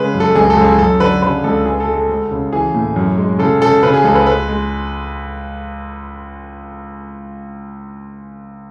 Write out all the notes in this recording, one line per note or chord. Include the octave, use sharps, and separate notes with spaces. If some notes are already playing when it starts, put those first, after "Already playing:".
Already playing: C#3 G#3 B4
F#2
A4
C#2 G#4
A4
C#2
G#4
F#2 A4
D3 B4
C#3 B4
C#2 A4
G#3 G#4
A4
G#3
A4
D2
C#3
E3 G#4
A2
F#2
G#3
C#3 A4
C#3 A4
C#3 B4
G#4
C#2 A4
B4
G#3 B4
G#3